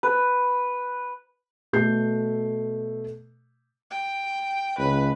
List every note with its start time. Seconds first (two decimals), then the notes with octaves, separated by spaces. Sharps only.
0.03 B4
1.73 B2 A3 A4 G6 C7
3.90 G5
4.78 C#2 B4